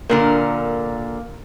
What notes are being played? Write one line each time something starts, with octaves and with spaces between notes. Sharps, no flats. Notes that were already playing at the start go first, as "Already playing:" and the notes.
A#2 D3 A#3 A#4